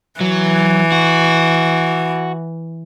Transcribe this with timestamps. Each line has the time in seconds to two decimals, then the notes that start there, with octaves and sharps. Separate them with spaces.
0.21 E3 F#3
0.92 F#4